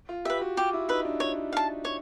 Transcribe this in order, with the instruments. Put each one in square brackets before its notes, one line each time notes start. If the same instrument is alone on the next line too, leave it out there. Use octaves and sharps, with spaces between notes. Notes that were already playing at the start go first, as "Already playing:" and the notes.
[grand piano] F4
[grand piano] G4 [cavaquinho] B4 E5
[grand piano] F#4
[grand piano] F4 [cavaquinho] G4
[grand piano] E4
[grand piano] D#4 [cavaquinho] B4 E5
[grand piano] D4
[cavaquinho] C#5
F5 A5
C#5